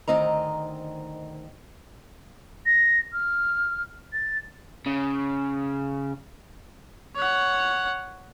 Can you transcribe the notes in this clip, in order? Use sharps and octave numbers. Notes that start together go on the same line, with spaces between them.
D2 D#3 C4 D#5 A#5
A#6
F6
A6
C#3
C#5 F#5